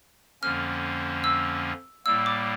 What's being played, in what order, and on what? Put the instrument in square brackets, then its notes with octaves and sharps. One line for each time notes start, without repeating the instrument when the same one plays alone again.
[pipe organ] F2 D3 F3 A#3 C#4 [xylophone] F6
[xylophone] E6
[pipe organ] A2 G3 A#3 [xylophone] E6
[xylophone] D6